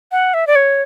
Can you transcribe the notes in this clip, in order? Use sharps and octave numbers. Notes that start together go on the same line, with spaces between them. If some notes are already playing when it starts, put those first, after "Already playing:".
F#5
E5
D5
C#5